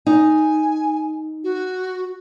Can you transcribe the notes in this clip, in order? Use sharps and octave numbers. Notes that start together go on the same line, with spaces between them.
D#4 G#5
F#4